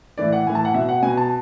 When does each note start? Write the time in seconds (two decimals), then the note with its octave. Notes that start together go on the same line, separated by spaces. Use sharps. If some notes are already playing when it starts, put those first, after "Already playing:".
0.18 A2 E3 D5
0.32 F#5
0.46 A2 E3 G#5
0.55 A5
0.65 F#5
0.74 B2 E5
0.89 F#5
1.02 B2 G#5
1.17 A5